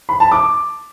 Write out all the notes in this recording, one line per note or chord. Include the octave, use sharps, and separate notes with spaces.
B5
A5
D6